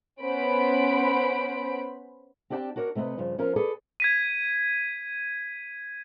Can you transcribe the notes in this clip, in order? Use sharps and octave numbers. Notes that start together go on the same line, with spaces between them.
B3 C#4 C5 B5 D7
C4 D4 G4 D5 G5 A5
D4 F#4 A#4 C#5 D5
C3 A3 C4 B4 D#5
G2 C#3 F3
F3 C#4 F4 A#4
G#4 A4 B4 D5
G#6 B6 D#7